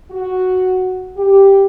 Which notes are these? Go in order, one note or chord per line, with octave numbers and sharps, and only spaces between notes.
F#4
G4